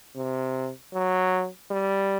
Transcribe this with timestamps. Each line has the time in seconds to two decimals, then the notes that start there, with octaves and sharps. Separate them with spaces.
0.16 C3
0.93 F#3
1.71 G3